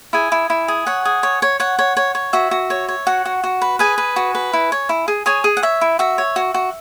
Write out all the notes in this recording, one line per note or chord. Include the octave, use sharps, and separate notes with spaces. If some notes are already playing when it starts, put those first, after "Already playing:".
E4 G#4 G#5
E4
E4
G#4
C#5 F#5
G#4
C#5
C#5
C#5 F#5
C#5
C#5
C#5
F#4 E5
F#4
C#5
C#5
F#4 F#5
F#4
F#4
B4
G#4 B4 G#5
B4
F#4
B4
E4
C#5
E4
G#4
G#4 C#5 G#5
G#4
F#5
C#5 E5
E4
F#4 E5
C#5
F#4
F#4